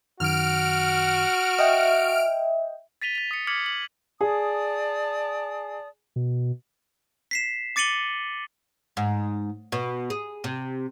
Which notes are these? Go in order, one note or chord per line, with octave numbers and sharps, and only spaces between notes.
F#2 D#3 F#4 F6 D7
D#5 E5 G5
A6 B6 D#7 F7 G7
A6 F7
D#6 C#7
D6 F6 G#6 B6 C#7 F#7
F#7
G#4 D5 A5 D#6
B2
B6 C7 E7
D6 A6 C#7 D#7 F#7 G7
G#2
B2
G#4
C3